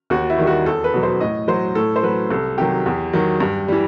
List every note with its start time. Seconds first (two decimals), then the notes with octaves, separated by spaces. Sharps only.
0.10 D#2 F#4
0.30 E4
0.38 D#3 G3
0.47 F#4
0.66 E2 A4
0.84 B4
0.93 B2 F#3
1.03 C5
1.20 A2 D#5
1.48 F#3 C5
1.75 A2 A4
1.96 C5
2.03 F#3 B4
2.31 C2 A4
2.58 C3 D#3 F#3 G4
2.86 E2
3.13 D#3 F#3
3.40 G2
3.68 E3 G3